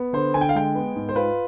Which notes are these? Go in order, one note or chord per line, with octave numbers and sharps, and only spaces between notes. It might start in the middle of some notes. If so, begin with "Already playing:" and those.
Already playing: B3
D3 C5
D3 G#5
G5
F5
G#3 G5
B3
G#2
C5
F4 B4